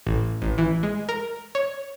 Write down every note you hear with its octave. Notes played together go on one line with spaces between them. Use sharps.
A1
A1
E3
G#3
A#4
C#5